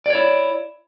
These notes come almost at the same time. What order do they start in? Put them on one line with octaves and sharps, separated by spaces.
D5 C#5 E4